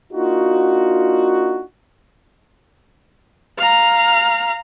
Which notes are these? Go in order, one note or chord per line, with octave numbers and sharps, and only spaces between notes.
A#3 D4 D#4 F4 F#4
F5 A#5